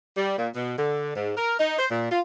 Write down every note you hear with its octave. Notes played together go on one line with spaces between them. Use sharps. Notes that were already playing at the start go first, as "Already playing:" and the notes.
G3
A#2
B2
D3
G#2
A#4
D#4
C5
A#2
F4